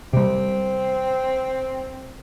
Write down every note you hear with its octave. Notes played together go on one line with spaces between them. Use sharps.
C3 G3 C4